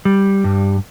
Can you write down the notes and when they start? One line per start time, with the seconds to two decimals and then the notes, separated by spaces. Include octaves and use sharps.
0.05 G3
0.44 G2